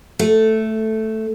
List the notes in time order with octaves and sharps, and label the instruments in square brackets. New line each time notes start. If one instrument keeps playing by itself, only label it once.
[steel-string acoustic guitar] A3